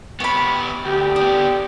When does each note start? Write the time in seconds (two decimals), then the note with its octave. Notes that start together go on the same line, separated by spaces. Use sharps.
0.20 B3 G4 C#5 B5
0.85 D2 G4
1.16 B3 D4 D#6